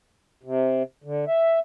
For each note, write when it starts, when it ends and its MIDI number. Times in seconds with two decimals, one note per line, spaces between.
0.43 0.83 48
1.04 1.25 50
1.28 1.59 76